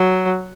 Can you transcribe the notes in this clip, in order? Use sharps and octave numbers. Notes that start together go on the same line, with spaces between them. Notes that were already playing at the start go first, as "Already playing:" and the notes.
Already playing: F#3